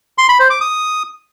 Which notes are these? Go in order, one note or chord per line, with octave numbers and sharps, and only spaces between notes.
C6
B5
C5
D6
D#6